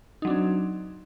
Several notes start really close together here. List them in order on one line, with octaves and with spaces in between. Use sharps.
D#4 F#3 D4 C4